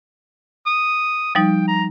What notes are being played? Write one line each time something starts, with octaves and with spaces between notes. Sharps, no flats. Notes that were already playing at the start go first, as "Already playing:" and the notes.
D#6
F3 G3 D#4 G5
A#5